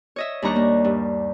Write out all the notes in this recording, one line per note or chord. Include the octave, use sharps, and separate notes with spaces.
C#5 D#5 E5
D#2 G3 D4 A#5 C#6 F#6
A#3
G2